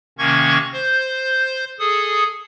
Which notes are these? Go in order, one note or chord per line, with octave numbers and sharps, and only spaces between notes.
C3 D#3 A#3 C#4 C#6 G#6
C5 G6
G#4 A4 D#6